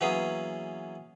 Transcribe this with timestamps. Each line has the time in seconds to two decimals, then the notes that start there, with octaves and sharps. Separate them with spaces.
0.01 E3 F#3 A#3 B3 C#4 G#4